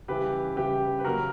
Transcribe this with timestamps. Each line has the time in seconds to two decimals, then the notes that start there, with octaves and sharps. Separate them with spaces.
0.08 C#3 E3 G3 G4 B4
0.56 C#3 E3 G3 G4 B4
0.99 B4
1.04 C#3 F#3 A#3 F#4 A#4